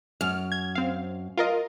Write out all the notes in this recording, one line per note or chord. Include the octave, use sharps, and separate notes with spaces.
F#2 F6
G#6
C4 F5
F4 A#4 D#5